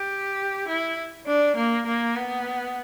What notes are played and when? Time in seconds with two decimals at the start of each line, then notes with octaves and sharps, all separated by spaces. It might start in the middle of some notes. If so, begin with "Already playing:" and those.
Already playing: G4
0.68 E4
1.27 D4
1.57 A#3
1.86 A#3
2.16 B3